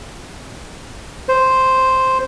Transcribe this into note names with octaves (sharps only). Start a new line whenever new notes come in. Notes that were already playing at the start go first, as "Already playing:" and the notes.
C5